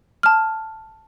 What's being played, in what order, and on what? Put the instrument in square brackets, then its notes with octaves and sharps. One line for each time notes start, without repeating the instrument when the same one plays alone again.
[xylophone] A5 F6